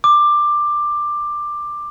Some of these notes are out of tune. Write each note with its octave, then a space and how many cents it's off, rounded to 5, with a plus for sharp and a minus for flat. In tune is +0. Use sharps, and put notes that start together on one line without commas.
D6 +15